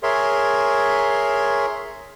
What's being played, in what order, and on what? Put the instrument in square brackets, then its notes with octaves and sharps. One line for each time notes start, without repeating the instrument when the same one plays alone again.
[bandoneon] G#4 A#4 C#5 E5 C6